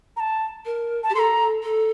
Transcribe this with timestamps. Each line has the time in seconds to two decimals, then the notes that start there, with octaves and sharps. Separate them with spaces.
0.17 A#5
0.20 A5
0.66 A#4
1.03 A5
1.10 G4
1.15 A4 A#5 C6
1.63 A4